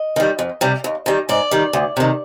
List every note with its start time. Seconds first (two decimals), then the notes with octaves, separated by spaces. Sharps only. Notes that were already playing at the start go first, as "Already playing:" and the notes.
Already playing: D#5
0.16 D#3 G3
0.39 F2
0.61 C3 G3
0.84 D#2
1.06 D#3 G3
1.29 G#2 D5
1.51 D#3 G3
1.73 D2
1.97 C3 D#3